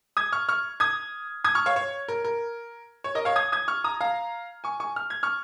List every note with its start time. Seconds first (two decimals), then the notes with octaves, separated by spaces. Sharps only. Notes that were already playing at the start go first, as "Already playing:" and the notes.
0.17 D#6 G#6
0.33 C#6 F6
0.49 C#6 F6
0.80 D#6 G#6
1.44 D#6 G#6
1.55 C#6 F6
1.66 C#5 F5
1.76 C#5
2.08 A#4
2.25 A#4
3.04 C#5
3.15 A#4 D#5
3.25 C#5 F5
3.36 D#6 G#6
3.52 D#6 G#6
3.68 C#6 F6
3.84 A#5 D#6
4.01 F5 A#5
4.64 G#5 C#6
4.80 G#5 C#6
4.96 F6
5.10 G#6
5.23 C#6 F6